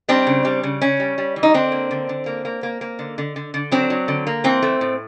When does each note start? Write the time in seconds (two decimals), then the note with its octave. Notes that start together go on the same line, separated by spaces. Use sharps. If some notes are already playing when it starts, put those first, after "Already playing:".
0.08 G3 C4 D4
0.27 C#3
0.45 G3
0.63 C#3
0.82 C#3 C#4
1.00 G3
1.18 G3
1.36 E3
1.43 D#4
1.54 D3 C4 D4
1.72 A#3
1.91 D3
2.09 D3
2.26 A#3
2.45 A#3
2.63 A#3
2.81 A#3
2.99 D3
3.18 D3
3.36 D3
3.54 D3
3.71 F#3 C4 D4
3.90 F#3
4.08 D3
4.27 A#3
4.44 E3 C4
4.62 A3
4.81 A2